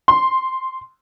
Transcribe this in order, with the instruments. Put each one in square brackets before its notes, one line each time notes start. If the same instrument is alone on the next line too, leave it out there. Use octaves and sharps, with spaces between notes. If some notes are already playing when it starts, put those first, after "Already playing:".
[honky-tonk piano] C6